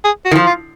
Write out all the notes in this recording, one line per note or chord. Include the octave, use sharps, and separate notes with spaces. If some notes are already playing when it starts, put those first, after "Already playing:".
G#4
F#4
D#3
F3
F4